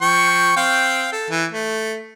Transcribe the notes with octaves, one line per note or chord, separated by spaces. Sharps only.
F3 G5 C#6
C4 F5 G5
A4
E3
A3